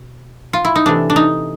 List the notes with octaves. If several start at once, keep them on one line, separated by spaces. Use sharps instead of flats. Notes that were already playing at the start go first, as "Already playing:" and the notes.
Already playing: B2
F4
E4
D#4
C3 E3 A3 D4
D4
D#4